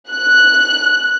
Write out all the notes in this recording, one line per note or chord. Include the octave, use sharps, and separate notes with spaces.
F#6